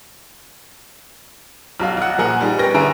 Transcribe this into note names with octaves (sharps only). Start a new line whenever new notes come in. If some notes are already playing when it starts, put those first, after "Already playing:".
B1 F#3 F5
B1 F#5
A#2 F3 G#4 A#4 F#5 A#5
G3 D#4 G#4
B3 C#4 A#4 G5 A#6
D3 C#4 E4 G#4 A#5 D7